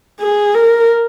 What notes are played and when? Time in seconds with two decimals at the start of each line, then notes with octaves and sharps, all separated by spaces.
0.20 G#4
0.55 A#4